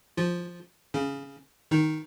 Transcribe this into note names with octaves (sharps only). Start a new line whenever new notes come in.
F3 F4
C#3 C#4
D#3 D#4